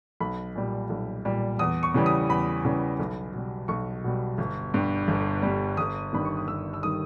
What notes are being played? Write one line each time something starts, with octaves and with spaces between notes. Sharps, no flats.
B1 B5
A#2 G3
B1
A#2 G3
E2 D#6
C#6
C#3 E3 G3
D#6
E2 B5
C#3 E3 G3
B1
B2 G3
B1 C#6
B2 G3
G1
G2 G3
G1
G2 G3
G1 D#6
G2 D#3 G3 B5
C#6
D#6
G1 E6
E6
D#3 G3 D#6